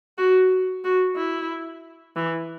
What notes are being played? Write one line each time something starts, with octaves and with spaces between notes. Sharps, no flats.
F#4
F#4
E4
E3